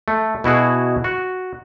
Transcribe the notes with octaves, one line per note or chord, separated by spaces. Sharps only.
A3
B2 E4 F#4 G#4
F#4